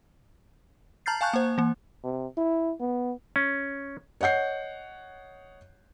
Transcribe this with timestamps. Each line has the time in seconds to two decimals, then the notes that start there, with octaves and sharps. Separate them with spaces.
1.06 A5 A#5 F6 G6 A6 C7
1.21 F5 G#5 A5 C#6 F#6 G6
1.34 A#3 C5
1.58 E3 A#3
2.04 C3
2.38 E4
2.80 B3
3.36 C#4
4.21 C#5 D#5 F#5 G6 C7